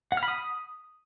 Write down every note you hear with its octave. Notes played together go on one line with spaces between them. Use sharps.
F#5
F6
B5
D#6